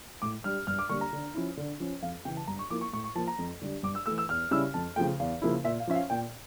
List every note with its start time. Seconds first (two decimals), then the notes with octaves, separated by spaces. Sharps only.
0.22 A2 D6
0.44 G3 D4 F6
0.67 G2 F6
0.79 D6
0.89 D3 G3 A#3 C#6
1.01 A#5
1.13 D3
1.34 F3 C#4 E4
1.57 D3
1.80 F3 C#4
2.02 F2 F5
2.25 C#3 E3 G5
2.37 A5
2.47 G2 A#5
2.59 C#6
2.70 F3 A#3 E4 D6
2.81 C#6
2.93 A2 C#6
3.04 C#6
3.15 F3 A#3 A5
3.27 A#5
3.38 F2
3.62 D3 G3 D4
3.83 G2 D6
3.95 E6
4.06 E3 A3 E6
4.18 E6
4.29 E2 F6
4.51 C#3 G3 C#4 E4 E6
4.74 F2 A5
4.96 C#3 F3 A3 G5
5.20 E2 F5
5.42 C#3 F3 A#3 E4
5.64 A#2 E5
5.80 F5
5.87 F3 C#4 E5
5.95 F5
6.10 A#2 G5